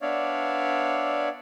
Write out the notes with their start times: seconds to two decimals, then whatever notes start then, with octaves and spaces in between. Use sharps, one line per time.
0.02 B3 D4 C#5 D5 E5 F5